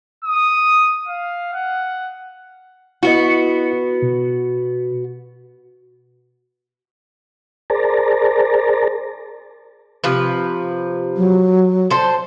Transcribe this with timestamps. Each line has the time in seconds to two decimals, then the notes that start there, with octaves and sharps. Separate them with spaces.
0.25 D#6
1.08 F5
1.54 F#5
3.03 B3 E4 F#4 D#5
4.02 B2
7.70 G#4 A#4 C5 D5 A5 A#5
10.04 C3 F3 B4
11.17 F#3
11.90 A4 C5